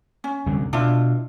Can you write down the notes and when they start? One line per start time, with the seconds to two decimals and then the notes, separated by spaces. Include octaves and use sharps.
0.24 C#4
0.46 C2 F#2 D3
0.73 B2 D4 E4 F4